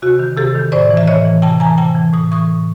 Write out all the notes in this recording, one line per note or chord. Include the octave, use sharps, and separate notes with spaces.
C3 F#4
D#3
C3 G4 A4
D#3
A2 C5 D5
E3
E5
A2 C#5 D#5
E3
C3 G5 A5
E3 G#5 A#5
C3 G5 A5
E3
A2 D#6
E3 C#6 D#6
A2